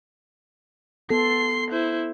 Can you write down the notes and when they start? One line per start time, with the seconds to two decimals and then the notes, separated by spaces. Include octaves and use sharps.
1.10 B3 A4 C6 C7
1.70 E4 C5